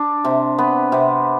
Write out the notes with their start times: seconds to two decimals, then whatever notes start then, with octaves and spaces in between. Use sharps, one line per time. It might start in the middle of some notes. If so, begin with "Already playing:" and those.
Already playing: D4
0.25 C3
0.58 B3
0.92 C3